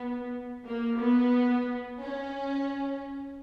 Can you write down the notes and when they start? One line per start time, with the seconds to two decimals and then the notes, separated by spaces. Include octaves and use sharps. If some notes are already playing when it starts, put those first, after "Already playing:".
Already playing: B3
0.66 A#3
1.01 B3
2.02 C#4